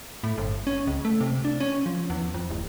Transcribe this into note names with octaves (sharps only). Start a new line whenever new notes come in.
A2
G1
C#4
C#2
A3
C3
D4
C#4
F3
E2
F2
D1